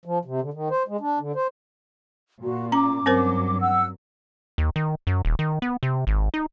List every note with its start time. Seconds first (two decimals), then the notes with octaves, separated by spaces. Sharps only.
0.05 F3
0.25 C3
0.41 D3
0.54 D#3
0.70 C5
0.88 G#3
1.00 D4
1.19 D3
1.35 C5
2.42 A#2 F#4
2.72 C#4 A#5 D6
3.06 G2 F#3 C4 A#4 C5
3.60 F#5 E6
4.58 D#2
4.76 D#3
5.07 F#2
5.25 D#1
5.39 D#3
5.62 B3
5.83 C3
6.07 G#1
6.34 D#4